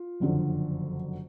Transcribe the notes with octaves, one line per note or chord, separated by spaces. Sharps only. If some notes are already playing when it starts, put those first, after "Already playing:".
Already playing: F4
F#1 F2 D3 F#3